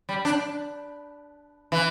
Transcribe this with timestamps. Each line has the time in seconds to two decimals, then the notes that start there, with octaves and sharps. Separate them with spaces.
0.09 G3
0.25 D4
1.72 E3